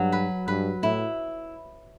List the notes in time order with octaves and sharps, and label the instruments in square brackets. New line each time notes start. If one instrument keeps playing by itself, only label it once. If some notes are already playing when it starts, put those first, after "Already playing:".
Already playing: [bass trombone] G2 [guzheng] F#3
[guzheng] B4
[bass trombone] G2 [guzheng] B4
[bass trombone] A2 [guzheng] E4